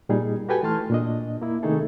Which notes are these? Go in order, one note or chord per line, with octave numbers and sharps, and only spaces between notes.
A#2 G3 D#4 G#4
F#4 G4 A4 B4 G5 G#5
E3 A3 A5 C6 F6
A#2 D4 D#5
A#3 E4
C3 D#3 A3 D#4 G#4 A4